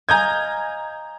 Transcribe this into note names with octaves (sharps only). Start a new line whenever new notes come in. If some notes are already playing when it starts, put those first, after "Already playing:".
D#5 F5 G#5 A#5 G6 G#6